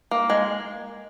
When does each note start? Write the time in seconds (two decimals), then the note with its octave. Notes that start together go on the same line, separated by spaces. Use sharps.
0.11 A#3
0.30 G#3